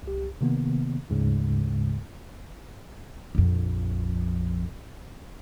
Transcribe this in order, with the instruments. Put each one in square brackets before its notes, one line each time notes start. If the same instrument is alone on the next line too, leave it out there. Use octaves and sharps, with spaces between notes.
[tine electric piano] C2 G4
C3 D#3 A#3 B3
D2 G#2 C#3 G#3
[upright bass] A#1 F2